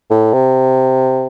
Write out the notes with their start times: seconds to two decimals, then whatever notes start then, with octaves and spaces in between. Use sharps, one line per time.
0.10 A2
0.33 C3